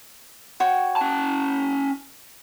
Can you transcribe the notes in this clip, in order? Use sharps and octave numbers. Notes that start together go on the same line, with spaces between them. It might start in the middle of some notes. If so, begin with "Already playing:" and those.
F#4 C#5 G5
C#4 A5